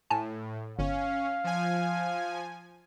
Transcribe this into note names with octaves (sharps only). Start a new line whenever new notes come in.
A2 G#5 A5
G1 C#4 F5
F3 G#5